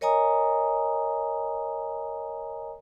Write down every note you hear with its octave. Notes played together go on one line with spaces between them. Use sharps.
A#4 C#5 D#5 G#5 A#5 D#6